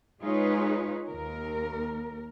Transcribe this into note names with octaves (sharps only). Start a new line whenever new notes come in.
G#3 D#4 F4 G#4 B4 C#5
D#2 A#4